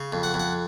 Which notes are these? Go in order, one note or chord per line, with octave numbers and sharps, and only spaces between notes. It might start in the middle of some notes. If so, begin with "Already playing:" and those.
Already playing: C#3
F2
F#5
F2
F#5